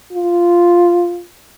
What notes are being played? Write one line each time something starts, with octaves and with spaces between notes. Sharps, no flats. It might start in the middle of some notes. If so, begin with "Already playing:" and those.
F4